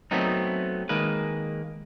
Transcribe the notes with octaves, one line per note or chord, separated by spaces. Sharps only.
F#3 A3 B3 C4 D#4
D#3 G#3 A#3 B4